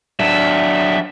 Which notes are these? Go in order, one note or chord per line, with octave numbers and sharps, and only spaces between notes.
F#3 D4 E5